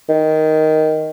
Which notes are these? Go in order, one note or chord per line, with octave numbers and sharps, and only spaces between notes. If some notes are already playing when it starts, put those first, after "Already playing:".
D#3